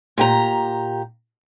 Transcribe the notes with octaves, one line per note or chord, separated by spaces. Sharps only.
A#2 G4 A#5